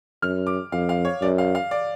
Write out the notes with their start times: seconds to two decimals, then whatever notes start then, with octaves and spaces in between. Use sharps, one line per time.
0.22 F#2 F6
0.47 D6
0.72 F2 F5
0.89 F5
1.05 C#5
1.21 F#2 D5
1.38 F5
1.55 F5
1.71 D5